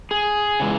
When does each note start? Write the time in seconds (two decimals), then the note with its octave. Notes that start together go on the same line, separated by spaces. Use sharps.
0.11 G#4
0.60 C#3 E3 G#3